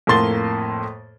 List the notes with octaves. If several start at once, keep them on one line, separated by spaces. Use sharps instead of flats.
F2 A2 A#3 C6 A6 G7